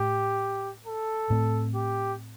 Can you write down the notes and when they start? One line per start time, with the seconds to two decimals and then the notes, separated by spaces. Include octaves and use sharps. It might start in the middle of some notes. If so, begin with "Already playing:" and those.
Already playing: A2 A3 G4
0.87 A4
1.30 A2 A3 C4
1.75 G4